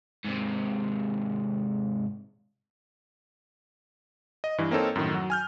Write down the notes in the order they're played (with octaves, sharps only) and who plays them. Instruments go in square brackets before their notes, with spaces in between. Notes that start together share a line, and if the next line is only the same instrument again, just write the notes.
[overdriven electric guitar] G#2 C3
[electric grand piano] D#5
G2 E3
A#3 C4 D#4 A4 C#5
F#2 A2 D#3
F#3
G#5 F6 G6